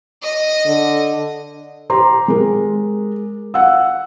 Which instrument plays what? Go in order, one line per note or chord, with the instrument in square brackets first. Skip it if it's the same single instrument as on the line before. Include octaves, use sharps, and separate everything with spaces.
[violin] D#5
[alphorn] D3
[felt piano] G4 C5 A#5 C6
G#3 A#4
F5 F#5 E6